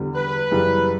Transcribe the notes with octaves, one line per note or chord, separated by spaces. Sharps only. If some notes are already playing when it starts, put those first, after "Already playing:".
Already playing: E2 D3 G3
B4
F#2 C#3 E3 G3